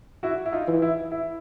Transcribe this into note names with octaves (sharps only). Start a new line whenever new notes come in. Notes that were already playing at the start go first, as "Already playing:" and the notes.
E4 F#4
E4
D#4 F4
E3
E4
E4